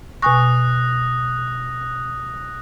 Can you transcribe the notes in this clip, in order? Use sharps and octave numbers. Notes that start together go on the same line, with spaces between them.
B2 G#5 C#6 D#6 F#6 A#6